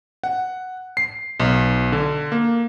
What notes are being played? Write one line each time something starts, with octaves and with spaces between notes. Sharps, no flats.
F#5
C7
B1
D3
A#3